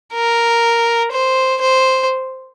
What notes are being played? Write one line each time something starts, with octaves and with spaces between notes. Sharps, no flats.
A#4
C5
C5